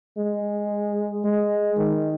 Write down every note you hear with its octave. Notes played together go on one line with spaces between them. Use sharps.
G#3
G#3
D#3